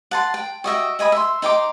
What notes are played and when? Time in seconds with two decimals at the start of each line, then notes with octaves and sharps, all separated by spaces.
0.11 F#5 A5 C6
0.34 G5
0.64 F#4 D#5 E5 G5
0.99 D#5 G#5 B5 D#6
1.12 E5 C6
1.42 D#4 G5 C6 D6